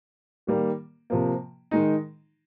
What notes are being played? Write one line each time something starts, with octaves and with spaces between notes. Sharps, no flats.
D#3 G3 A#3
C3 F3 A#3
D#3 G#3 D#4